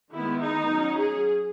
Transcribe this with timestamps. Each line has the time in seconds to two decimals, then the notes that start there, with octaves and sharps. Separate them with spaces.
0.11 D#3 G#3 B3 E4
0.41 D#4
0.69 F#3 C#4
0.98 G#4